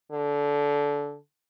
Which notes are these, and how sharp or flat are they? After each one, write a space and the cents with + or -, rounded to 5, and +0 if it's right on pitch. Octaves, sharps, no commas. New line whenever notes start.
D3 -20